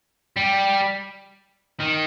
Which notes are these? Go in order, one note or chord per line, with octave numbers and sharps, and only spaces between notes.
G3
D#3